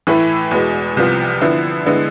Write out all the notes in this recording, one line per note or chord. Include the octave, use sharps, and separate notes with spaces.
A2 E3 A3 E4 B4
E2 B2 G#3 B3
C2 C3 F3 B3 F4
D3 F3 B3 E4
D3 G#3 B3 E4